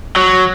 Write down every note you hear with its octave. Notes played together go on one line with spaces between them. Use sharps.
F#3